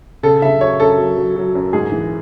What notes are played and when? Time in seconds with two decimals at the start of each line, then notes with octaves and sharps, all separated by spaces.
0.23 C#3 A4
0.42 C#3 E5
0.61 F#2 C#5
0.80 F#2 A4
0.98 F#3
1.17 F#3
1.36 F#3
1.55 F#2
1.73 G#2 G#4
1.92 E3